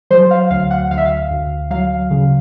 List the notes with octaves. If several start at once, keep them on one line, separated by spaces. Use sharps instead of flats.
F#3 C5
F5
D2 F5
F#5
D2 F5
E5
F5
D2
F#3 F5
C#3